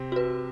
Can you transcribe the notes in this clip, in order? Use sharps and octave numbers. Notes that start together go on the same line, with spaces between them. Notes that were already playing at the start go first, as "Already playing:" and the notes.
Already playing: C3 C4
F#4 B4